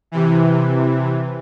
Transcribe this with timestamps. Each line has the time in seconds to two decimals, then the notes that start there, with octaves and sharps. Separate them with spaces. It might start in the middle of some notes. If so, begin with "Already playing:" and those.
0.11 C3 E3